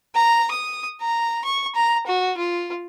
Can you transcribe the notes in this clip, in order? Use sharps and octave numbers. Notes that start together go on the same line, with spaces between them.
A#5
D#6
A#5
C#6
A#5
F#4
F4